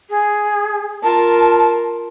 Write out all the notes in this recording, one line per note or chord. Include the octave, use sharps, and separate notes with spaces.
G#4
F4 A#4 A5